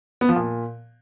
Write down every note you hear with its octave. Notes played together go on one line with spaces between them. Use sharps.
B3
F3
A#2